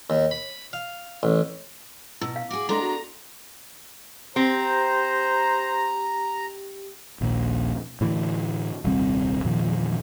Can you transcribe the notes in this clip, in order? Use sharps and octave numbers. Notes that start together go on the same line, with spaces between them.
D#2
B5
F5
A1
B2 E4 E6
F5
F#4 G#4 D6
G#3 B3 D4 E4 A4 A#5 C6
F#4
C4 G4 C5 A#5
A#1 D#2 A#2
A2 D3 E3
D#1 C2 G3 C4
E2 A#2 D#3 F3